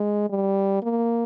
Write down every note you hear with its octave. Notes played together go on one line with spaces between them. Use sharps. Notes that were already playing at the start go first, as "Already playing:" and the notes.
Already playing: G#3
G3
A#3